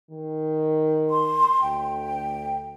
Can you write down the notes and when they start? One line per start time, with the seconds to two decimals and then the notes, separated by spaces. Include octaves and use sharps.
0.11 D#3
1.10 C6
1.62 D2 G5